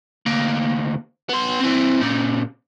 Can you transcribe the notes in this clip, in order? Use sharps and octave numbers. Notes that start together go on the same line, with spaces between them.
D2 A#3
B3 C6
E3 C4
A#2 C#3